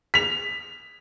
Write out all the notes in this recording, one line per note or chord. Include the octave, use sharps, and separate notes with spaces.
B6 F7